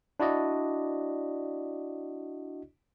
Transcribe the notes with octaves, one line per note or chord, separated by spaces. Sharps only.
D4 E4 F#4 D5 D#5